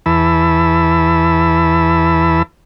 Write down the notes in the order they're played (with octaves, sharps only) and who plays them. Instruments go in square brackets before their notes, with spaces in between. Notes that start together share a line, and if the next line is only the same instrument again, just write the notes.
[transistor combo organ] E2 E3 B4 A5 B5 E6